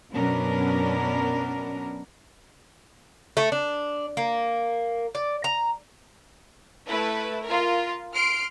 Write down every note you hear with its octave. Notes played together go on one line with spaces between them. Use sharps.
F#2 B2 B3 C#4 D4 A#4
A3
D4
A#3
D5
A#5
A3 E4 B4
F4 A#4
C6 F6 C7 D7